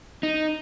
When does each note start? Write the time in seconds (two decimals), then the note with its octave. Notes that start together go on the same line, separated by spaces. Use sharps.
0.23 D#4